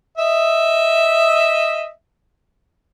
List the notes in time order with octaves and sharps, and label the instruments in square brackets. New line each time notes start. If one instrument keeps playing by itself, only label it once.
[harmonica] D#5 E5